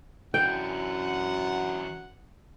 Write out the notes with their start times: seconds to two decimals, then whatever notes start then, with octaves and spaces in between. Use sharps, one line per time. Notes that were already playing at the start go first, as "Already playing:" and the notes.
0.34 F#2 E3 D4 F#5 G5